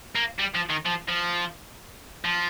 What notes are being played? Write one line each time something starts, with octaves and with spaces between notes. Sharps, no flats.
A#3
G3
F3
D#3
F3
F3
F3